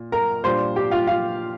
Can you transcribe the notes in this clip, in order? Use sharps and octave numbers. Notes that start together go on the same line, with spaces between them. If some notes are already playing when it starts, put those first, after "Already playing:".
Already playing: A#2
A#4 A#5
A#2 G3 D4 C5 C6
G4 G5
F4 F5
F4 F5